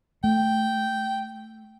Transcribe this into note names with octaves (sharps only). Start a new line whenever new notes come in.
A3 G5